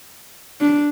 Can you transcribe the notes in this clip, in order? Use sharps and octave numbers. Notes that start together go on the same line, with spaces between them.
D4